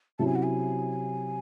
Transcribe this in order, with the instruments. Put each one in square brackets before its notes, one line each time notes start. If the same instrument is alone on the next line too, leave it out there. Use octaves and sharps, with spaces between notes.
[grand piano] C3 F#3 C#4 E4 [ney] A5
[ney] G#5
F#5
G#5